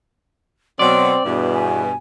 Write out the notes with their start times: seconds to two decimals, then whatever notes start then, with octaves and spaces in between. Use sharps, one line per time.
0.79 B2 F#3 C4 D5 C6
1.25 E2 G2 B2 B4
1.54 G#5